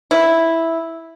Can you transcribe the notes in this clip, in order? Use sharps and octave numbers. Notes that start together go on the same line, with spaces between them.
E4